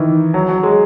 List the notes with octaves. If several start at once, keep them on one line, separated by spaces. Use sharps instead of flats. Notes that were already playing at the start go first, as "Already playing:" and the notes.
Already playing: D#3 E3
F#3
F#3
G#3